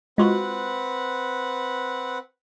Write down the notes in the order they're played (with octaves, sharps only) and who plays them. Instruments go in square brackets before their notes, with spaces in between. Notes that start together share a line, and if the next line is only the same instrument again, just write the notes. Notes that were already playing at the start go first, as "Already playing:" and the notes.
[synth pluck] G#3 F4 F#4 [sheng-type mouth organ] C4 B4 F#5